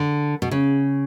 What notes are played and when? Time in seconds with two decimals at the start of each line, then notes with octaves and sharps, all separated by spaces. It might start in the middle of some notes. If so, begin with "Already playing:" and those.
Already playing: D3
0.42 B2
0.51 C#3